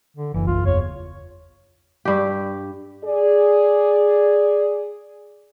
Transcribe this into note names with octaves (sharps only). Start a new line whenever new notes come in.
D3
F#1 E3
B1 F4
E2 C#5
G2 G4
G#4 D5